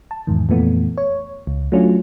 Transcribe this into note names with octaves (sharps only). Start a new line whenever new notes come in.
A5
E2 G#2 D#3
F2 A#2 E3 A3 B3
C#5
C#2
F#3 A3 C#4 D4 F4